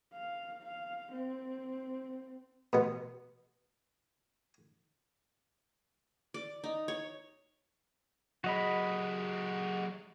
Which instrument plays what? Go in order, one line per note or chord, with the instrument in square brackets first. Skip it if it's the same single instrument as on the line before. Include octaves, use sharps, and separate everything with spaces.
[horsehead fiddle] F5
F5
C4
[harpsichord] B2 B3
[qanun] D5
D#4
C#5
[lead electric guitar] F#3 G#3 [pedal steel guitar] F#4 D#5 B5